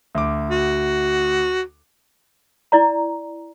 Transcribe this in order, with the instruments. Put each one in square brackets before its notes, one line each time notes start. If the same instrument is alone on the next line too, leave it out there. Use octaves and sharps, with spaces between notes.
[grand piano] D2 D6
[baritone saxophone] F#4
[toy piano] E4 D5 A#5